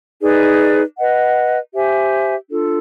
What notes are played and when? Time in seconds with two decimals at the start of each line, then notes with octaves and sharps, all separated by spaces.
0.20 D#4 G#4 B4 D5
0.97 B4 D#5 F#5
1.73 G4 C5 E5 G#5
2.50 D4 F4 A4